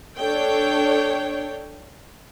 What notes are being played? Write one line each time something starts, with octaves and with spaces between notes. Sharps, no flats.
D4 A4 C#5 G5